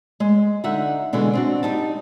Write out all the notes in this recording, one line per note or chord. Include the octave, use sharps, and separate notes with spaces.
G#3
D3 D#4 E5 F#5
B2 D3 E3 G#3
C4 D4 F#4
G3 D#4 A5